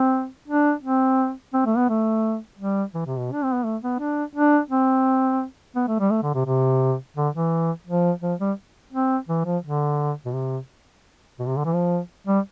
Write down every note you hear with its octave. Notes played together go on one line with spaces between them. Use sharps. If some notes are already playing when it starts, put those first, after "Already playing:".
Already playing: C4
D4
C4
C4
A3
B3
A3
G3
E3
C3
B2
D4
C4
B3
A3
B3
D4
D4
C4
B3
A3
G3
A3
D3
C3
C3
D3
E3
F3
F3
G3
C4
E3
F3
D3
B2
C3
B2
C3
D3
E3
F3
G3